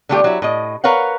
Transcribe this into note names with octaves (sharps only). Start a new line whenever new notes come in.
D3 G3 A3 F4 G4
F#3 E4
A2 D#5
A#4 B4 C#5 F5 F#5